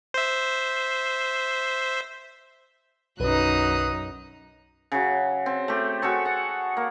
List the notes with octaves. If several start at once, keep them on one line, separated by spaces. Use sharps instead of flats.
C5 E5
B1 F#2 D#4 B4 D#6 F#6
C#3 F#3
C4
A3 G4
F#4 G#4 A4 C#5
F#5
A#3